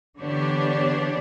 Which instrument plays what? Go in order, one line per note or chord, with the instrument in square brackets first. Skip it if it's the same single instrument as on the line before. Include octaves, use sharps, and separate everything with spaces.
[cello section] D3 E3 B3 D4 G4 C#5